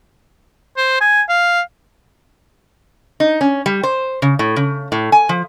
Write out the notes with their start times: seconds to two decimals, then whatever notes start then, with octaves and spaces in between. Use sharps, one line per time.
0.77 C5
1.01 G#5
1.29 F5
3.20 D#4
3.41 C#4
3.66 G3
3.83 C5
4.22 C#3
4.39 A2
4.56 C#3
4.92 A2
5.12 G#5
5.29 F3